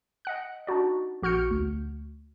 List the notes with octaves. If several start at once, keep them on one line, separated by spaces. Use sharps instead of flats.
D#5 F#5 F#6
D4 D#4 F#4 D5
A#1 F#4 F6 G6 C#7
D2